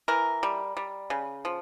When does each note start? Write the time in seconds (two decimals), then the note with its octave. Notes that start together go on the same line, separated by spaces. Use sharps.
0.08 E3 A#4
0.43 G3
0.77 G3
1.10 C#3
1.45 F3